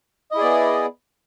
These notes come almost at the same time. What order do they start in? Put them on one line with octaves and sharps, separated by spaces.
D#5 E4 G#4 D5 B3